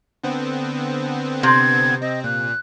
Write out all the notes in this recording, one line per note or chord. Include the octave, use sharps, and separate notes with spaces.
D3 B3 C4
C3 G#6
C4 D#5
A#2 F#6